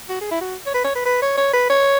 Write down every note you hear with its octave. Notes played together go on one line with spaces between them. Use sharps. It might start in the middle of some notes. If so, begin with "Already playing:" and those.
F#4
G#4
E4
F#4
C#5
B4
C#5
B4
B4
C#5
C#5
B4
C#5